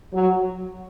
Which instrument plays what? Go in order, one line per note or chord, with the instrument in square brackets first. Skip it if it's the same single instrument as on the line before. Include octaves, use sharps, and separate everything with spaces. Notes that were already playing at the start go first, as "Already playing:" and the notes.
[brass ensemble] F#3